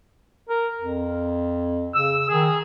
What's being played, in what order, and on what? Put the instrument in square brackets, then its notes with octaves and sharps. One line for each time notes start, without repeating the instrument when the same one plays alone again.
[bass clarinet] A#4
F2
[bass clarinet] C#3 [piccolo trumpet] E6
[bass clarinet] D#3 [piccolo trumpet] G#4